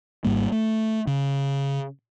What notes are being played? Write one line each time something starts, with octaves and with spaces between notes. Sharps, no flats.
G#1 G#2 G3 A#3
A3
C#3